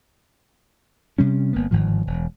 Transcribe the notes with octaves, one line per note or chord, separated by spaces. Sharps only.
C3 G3 C#4
G1 A#3 B3
G1 G#2 D#3 F3
E1